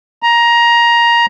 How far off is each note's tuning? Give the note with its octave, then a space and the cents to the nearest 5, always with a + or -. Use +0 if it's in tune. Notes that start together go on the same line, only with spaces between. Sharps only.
A#5 +15